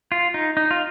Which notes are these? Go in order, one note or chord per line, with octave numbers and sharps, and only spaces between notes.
F4
D#4
D#4
F4